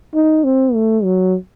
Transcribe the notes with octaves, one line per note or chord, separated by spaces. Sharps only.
D#4
C4
A3
F#3